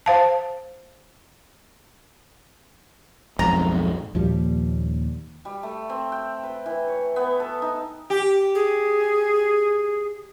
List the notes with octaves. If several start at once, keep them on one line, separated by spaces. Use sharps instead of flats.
C5 F5 A5
B1 F2 G#2 A#5
D#2 A#2 F3 G3
G3
A3
C4
G5
B4
E3
C#5
B3
A4
D#4
G4
G#4